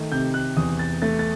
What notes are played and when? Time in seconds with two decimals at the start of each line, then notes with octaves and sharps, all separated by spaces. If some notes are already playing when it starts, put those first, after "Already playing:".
Already playing: D#3 A3
0.12 C3 G6
0.34 F#6
0.57 E2 D#6
0.79 A6
1.02 A3 A6
1.19 A6